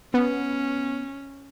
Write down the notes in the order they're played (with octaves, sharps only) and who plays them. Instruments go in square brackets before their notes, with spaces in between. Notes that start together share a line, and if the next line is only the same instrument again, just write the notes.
[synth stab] B3 [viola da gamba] C#4